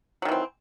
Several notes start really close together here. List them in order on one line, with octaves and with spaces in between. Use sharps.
F#3 D#3 E3 C4